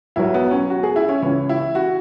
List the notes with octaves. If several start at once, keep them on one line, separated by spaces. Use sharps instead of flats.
B1 B2 F#3 E4
B3
C#4
F#4
G#4
E4
C#4
C#2 C#3 E3 C#4
E4
F#4